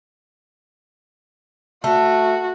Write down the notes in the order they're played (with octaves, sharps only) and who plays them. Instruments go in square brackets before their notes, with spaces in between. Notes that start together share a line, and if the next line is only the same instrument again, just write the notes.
[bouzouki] A3 [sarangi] F#4